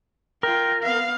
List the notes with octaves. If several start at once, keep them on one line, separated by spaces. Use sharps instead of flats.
F4 A#4 G5
B3 F5